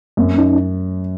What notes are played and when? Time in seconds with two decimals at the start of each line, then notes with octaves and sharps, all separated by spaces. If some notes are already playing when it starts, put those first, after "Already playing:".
0.17 F#2 A#3 C4
0.38 C#4 D#4